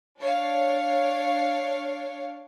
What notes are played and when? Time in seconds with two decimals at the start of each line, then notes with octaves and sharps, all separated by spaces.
0.19 D4 C#5 F5